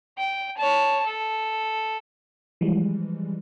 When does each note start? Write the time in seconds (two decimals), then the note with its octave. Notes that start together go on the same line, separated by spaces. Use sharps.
0.18 G5
0.57 C#5 A5
1.06 A4
2.61 E3 F3 G3 G#3